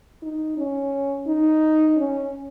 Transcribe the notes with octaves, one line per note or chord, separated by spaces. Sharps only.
D#4
C#4
D#4
C#4